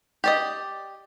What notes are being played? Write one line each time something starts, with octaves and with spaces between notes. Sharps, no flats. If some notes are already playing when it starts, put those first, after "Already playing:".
G4 D5 D#5